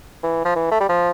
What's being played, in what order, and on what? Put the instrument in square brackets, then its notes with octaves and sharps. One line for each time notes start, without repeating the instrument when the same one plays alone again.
[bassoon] E3
F3
E3
A3
G3
F3